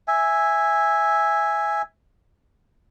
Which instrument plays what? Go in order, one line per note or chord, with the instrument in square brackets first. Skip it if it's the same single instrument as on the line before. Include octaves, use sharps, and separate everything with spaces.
[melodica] E5 G#5